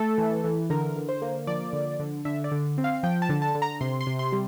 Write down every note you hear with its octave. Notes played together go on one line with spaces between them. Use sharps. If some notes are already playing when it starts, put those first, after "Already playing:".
Already playing: A3 A4
E3
E3
D3 A#4
D3
C5
A#3
F3 D5
D3
D3
D3 E5
D5
D3
C4
F5
F3 G5
A5
D3
A5
D3
A#5
C3 C6
C6
C3
C6
G3